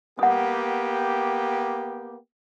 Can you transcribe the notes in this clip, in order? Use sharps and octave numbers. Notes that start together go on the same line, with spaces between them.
A#3 B3 G4 F#5 D#6